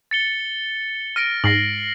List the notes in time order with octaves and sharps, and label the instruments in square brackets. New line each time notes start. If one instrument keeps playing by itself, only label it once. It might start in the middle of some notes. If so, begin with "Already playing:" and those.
[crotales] A6 C#7 G7
[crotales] F6 A#6 D7 [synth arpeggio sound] D#7
[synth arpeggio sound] G#2 [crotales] A#6 C7 F#7